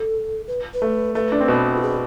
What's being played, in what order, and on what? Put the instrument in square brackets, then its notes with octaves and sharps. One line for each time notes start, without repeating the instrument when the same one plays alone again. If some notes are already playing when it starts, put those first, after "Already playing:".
Already playing: [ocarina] A4
B4
B4
[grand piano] A3
[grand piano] A3 [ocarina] B4
[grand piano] D4
C4
B2 B3
[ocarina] F4
G#4